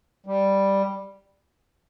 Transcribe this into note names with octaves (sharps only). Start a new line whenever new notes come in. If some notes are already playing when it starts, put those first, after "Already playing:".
G3